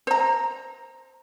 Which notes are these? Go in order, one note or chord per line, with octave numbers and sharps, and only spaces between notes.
C5 A#5